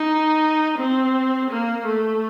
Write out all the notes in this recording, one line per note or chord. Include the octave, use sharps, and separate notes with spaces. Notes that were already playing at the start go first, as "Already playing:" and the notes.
Already playing: D#4
C4
A#3
A3